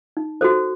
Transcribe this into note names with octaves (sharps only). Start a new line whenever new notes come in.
D#4
F#4 A4 C5